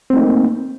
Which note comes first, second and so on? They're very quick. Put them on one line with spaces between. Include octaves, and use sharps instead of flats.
C4 A3 D#4 A#3